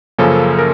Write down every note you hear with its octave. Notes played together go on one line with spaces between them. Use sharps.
F#2 C#3 F3 A#3 C#4 A4
A#4